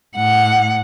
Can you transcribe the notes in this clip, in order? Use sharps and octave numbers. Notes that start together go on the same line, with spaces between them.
A2 F#5